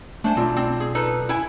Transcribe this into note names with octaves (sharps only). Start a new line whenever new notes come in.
A3 D4 C5 G#5
B1 C4 F4 D5
C4
G#4
D#4 A4 B4
E4 G#5